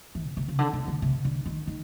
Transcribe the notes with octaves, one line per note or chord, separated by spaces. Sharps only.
E3
A#2
C3
C#3
D3
C3
D3
C3
D3
D#3
D#3